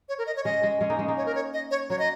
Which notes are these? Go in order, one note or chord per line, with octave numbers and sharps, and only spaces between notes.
C#5
A#4
D#5
C#5
G#3 C#4 D#5
G#3
G#3 C#4
A#3 D#4
G#3 C#4
A#3 D#4
C#5
A#4
C#5
D#5
C#5
F#3 A#3 C#5
D#5